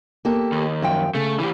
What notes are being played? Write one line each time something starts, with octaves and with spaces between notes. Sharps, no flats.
A#3 G4 A4
D#2
F#2 F3 G5
C#3 A3
E3 G4